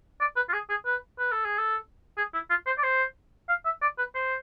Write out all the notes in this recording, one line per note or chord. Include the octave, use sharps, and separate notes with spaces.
D5
B4
F4
G#4
G#4
B4
B4
A4
G#4
A4
G#4
E4
F4
C5
D5
C5
F5
E5
D5
B4
C5